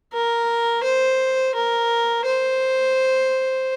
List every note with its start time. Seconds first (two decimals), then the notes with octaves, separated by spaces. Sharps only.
0.13 A#4
0.84 C5
1.55 A#4
2.25 C5